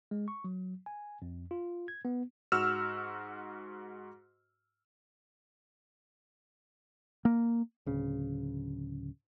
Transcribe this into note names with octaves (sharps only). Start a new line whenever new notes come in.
G#3
C#6
F#3
G#5
F2
F4
G#6
B3
G#2 F#4 E6 F6 E7
A#3
D1 C#3